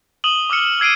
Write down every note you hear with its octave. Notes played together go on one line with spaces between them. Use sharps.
D#6 D#7 E7 F#7 G7
D6 E6 F6 C#7
E6 G#6 C7 D7 D#7